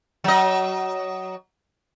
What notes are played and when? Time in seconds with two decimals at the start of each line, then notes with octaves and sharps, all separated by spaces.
0.24 F#3 D#5